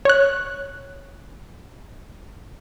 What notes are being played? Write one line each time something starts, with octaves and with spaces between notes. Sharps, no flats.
C#5 F#6